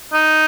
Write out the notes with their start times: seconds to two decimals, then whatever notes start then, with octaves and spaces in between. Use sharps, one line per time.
0.13 D#4